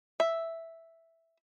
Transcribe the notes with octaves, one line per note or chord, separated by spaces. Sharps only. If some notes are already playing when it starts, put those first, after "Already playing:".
E5